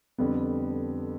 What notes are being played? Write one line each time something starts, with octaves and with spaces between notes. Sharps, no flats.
F2 D3 G3 B3